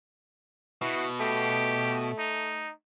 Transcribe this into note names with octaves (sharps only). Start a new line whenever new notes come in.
B2 E4 F#4
A3 G4
D#4